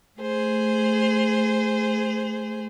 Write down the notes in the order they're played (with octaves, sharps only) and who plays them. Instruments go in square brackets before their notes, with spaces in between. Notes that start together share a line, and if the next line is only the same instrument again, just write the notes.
[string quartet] A3 G#4 C5